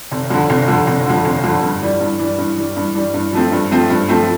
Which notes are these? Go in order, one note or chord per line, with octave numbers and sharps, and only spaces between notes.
F1
F2 D3
F1
F2 D3
F1
F2 D3
F1
F2 D3
G2
E3 G3
G2
E3 G3
G2
E3 G3
G2
E3 G3
G2
F3 A3 C4
G2
F3 A3 C4
G2
F3 A3 C4